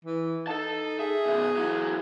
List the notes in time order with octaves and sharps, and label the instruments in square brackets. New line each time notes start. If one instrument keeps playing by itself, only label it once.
[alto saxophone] E3
[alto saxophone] D#4 [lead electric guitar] A4 A5
[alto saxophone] G#4 [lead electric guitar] E5
[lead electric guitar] B2 D#3
E3 F#3